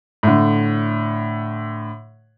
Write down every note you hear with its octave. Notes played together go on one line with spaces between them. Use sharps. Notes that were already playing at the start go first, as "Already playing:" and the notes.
A2 D3